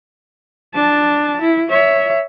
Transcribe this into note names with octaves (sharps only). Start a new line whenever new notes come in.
D4 A5
E4
C#5 E5